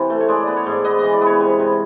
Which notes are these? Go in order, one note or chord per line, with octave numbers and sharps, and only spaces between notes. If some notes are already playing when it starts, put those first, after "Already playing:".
Already playing: C3 E3
A3
C#5
G#3 D5
B3 D5
C#5
G#2 D5
B3 D#5
E3 D#5
D5
B3 C#5
C3
C3